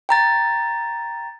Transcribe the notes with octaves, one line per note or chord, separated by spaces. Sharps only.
G5 A#5 A6